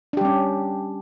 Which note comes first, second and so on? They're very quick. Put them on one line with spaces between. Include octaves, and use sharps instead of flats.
D4 G4 G3 C#4